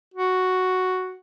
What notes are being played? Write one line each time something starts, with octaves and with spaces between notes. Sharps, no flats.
F#4